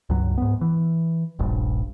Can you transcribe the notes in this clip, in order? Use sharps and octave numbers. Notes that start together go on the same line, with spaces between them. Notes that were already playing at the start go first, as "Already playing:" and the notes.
C#2 G2 F#3
G#2 B3
E3
D#1 A#1 G2